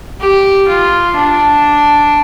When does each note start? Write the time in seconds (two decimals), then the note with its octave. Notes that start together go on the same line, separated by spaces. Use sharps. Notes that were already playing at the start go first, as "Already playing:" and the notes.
0.21 G4
0.68 F4
1.16 D4